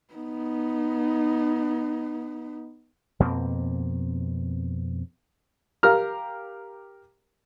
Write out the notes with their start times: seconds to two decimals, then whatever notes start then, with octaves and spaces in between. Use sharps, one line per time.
0.14 B3 D#4
3.20 F2 B2 A#3 C4
5.83 G4 A#4 F5 A#5 F6